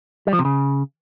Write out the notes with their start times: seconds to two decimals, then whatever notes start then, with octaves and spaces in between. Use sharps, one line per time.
0.27 G3
0.33 F3
0.39 C3
0.45 C#3